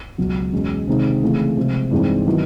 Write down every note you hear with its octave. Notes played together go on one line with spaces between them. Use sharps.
C#2 B2 F#3
E2 B2 G#3 C#4
C3 D#3 G#3 C4 D#4
C#3 E3 A3 C4
C3 F3 G#3
G2 E3 G#3 C4 D#4
D#3 F#3 B3 E4